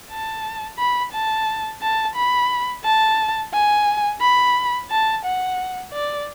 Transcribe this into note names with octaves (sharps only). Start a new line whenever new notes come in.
A5
B5
A5
A5
B5
A5
G#5
B5
A5
F#5
D5